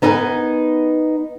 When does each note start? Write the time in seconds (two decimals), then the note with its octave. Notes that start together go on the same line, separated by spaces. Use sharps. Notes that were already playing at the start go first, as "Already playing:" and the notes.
0.02 B3 D#4 E4 A#4 B4 G#5